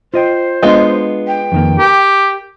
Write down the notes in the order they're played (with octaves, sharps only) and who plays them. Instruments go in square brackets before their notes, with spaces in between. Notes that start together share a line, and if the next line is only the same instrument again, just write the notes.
[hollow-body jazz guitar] F4 D#5 G5 [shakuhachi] C5
[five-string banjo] G#3 B3 F4 [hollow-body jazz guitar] D4 D#5
[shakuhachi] G5
[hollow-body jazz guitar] F2 D#3 A#3
[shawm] G4 [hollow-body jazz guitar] A#4